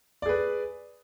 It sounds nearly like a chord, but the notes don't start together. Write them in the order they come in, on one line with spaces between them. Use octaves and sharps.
D5 G#4 B4